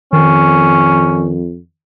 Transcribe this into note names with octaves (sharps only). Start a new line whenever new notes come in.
F2 D#3 C#4